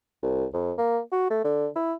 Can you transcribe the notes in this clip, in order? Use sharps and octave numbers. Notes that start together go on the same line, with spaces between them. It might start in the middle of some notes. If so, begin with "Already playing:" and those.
C2
F2
A#3
F#4
A3
D3
E4